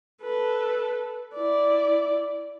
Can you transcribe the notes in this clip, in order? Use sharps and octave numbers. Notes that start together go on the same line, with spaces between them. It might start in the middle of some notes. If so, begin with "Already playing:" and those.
A4 B4
E4 D5